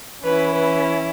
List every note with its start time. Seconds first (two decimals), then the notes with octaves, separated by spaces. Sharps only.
0.24 E3 C#4 E4 B4
0.55 B4